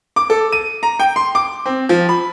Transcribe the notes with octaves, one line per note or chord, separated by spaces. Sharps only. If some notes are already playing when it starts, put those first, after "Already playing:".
D6
A4
D#7
A#5
G5
C6
D6
C4
F3
B5